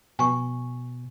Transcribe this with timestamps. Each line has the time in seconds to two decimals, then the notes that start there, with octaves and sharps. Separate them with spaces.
0.19 B2 G#5 C#6